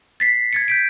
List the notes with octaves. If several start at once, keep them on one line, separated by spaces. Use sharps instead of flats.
A6 B6 C7
G#6 A6 C#7
G6 B6 D7